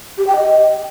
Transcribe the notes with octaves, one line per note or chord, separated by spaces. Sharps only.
G4
G5
D#5